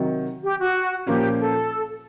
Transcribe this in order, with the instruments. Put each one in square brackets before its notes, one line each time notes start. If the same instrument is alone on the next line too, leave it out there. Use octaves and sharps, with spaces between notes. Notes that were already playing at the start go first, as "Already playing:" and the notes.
Already playing: [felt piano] C3 D#3 F#3
[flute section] G4
F#4
[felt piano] A#2 F3 A#3 C#4 F4 [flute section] G4
[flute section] A4